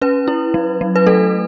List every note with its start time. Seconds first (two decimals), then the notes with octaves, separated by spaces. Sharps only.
0.01 C#4 B4
0.28 E4
0.54 F#3
0.81 F#3
0.96 B4
1.07 A3 A4